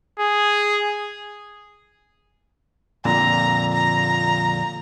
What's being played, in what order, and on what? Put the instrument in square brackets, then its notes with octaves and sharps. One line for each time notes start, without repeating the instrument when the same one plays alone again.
[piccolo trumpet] G#4
[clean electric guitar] F2 A#2 D3 [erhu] A#5
[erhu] A#5